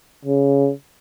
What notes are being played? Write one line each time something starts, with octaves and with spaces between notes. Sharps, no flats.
C#3